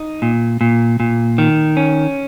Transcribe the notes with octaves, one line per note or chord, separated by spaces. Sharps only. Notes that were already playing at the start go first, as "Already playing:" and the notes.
Already playing: D#4
A#2
A#2
A#2
D#3
C#4